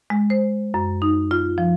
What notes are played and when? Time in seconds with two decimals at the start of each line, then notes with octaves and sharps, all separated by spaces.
0.10 G#3
0.30 C5
0.74 F#2
1.02 D#4
1.31 F4
1.58 F3